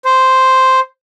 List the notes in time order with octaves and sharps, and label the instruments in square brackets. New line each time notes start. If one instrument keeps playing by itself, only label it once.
[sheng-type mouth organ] C5